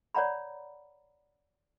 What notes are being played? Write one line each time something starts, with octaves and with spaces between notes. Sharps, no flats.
C#5 D5 F#5 A#5 B5